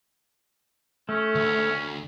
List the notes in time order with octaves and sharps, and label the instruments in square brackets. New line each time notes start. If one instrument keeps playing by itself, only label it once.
[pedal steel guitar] A3 [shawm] C#4
[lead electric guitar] D2